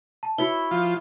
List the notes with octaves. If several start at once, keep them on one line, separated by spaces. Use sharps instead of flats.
A5
E4 F#4 C#5 G7
F3 F4